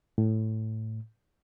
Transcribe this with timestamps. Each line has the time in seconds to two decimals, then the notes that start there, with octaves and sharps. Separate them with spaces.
0.18 A2